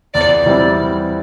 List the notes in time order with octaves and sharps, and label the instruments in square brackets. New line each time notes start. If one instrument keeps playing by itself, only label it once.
[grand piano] E2 [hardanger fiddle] D5
[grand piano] E3 G3 C4